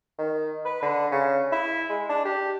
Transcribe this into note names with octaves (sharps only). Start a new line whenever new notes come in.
D#3
B4
D3
C#3
E4
G#3
D4
G4